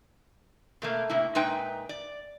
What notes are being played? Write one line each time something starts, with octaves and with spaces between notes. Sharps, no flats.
B2 A3 A#3
A2 C3 A#3 E4
A#2 G#3 D#4 B4 E5 G5
D5